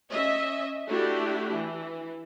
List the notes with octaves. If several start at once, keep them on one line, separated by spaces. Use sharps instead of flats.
C#4 D#5 E5
A3 D4 E4 F#4 G4
E3